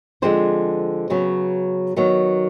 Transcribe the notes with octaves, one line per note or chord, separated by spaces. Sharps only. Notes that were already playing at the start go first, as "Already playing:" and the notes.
D3 F3 G#3 C4 C5
C#3 F#3 B3
D#3 F#3 B3